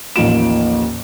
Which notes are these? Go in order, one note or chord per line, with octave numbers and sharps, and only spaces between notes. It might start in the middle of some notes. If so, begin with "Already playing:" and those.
A1 D#2 F3 F4 D7 E7